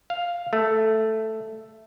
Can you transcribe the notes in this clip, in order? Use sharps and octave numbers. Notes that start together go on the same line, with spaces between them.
F5
A3